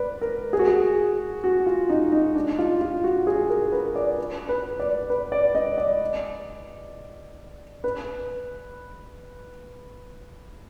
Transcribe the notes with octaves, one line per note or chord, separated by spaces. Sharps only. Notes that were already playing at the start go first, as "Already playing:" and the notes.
Already playing: B4 D5
A#4
G#4
F#4
G#4
F#4
F4
D#4
D#4
D4
F4
F4
F#4
G#4
A#4
B4
D5
B4
B4
D5
B4
D5
D#5
D5
B4